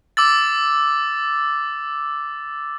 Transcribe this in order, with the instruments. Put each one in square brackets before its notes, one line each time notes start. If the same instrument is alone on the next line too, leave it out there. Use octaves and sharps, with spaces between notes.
[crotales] D6 E6 A6